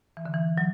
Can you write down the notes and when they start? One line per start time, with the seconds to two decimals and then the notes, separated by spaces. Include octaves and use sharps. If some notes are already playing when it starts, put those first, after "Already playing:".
0.17 E3
0.26 D3
0.34 E3
0.58 F#3